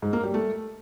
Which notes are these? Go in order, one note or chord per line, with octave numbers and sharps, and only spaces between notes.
G#2
A#3
G3
A3